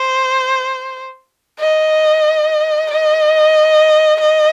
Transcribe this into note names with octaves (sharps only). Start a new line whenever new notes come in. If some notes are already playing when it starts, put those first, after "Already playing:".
Already playing: C5
D#5
D#5
D#5